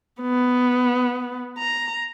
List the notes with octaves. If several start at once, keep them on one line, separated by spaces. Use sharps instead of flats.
B3
A#5